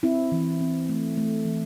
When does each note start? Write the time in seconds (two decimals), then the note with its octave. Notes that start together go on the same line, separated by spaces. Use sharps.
0.03 C4 E4
0.32 E3
0.61 C4
0.89 A3
1.17 A3
1.45 E3